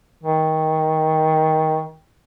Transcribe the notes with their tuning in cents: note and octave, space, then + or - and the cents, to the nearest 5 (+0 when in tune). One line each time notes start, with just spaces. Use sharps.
D#3 +20